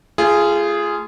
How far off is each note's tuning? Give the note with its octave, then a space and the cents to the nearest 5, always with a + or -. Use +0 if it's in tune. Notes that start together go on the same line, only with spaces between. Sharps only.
A3 +15 F4 -25 G#4 +0